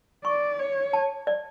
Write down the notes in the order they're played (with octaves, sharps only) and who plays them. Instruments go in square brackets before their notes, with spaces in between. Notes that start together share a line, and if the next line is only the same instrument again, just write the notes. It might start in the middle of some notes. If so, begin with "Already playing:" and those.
[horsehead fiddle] D5 [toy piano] C#6
[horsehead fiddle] C#5
[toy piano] A5
D5